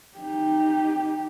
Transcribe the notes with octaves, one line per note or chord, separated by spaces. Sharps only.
D#4 G4